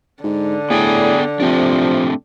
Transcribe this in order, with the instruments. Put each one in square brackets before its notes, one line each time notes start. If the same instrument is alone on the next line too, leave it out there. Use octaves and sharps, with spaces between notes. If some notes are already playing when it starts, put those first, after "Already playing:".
[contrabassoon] G#2 [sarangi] D3
[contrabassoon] A2 [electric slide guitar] B3 D5 G5 [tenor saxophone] G#4
[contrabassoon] C3 [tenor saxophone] F3 [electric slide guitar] A3 C4 D4